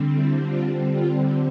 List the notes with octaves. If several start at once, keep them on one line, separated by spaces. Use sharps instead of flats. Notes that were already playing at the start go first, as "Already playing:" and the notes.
Already playing: D3 G3 C4
E4
F4
F4